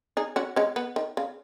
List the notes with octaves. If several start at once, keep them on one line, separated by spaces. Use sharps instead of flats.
D#4 G#4
C#4 F#4
G#3 C#4
B3
D#3
C#3